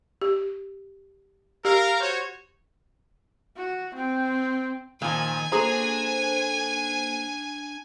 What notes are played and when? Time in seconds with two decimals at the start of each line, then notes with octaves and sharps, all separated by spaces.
0.21 G4
1.65 G4 A#4 F5
2.00 F#4 C5 C#5
3.56 F#4
3.95 C4 G5
5.02 A#2 D#3 F3 G#5
5.52 A#3 D4 F#4 G#4 A4 C5 A5 A#5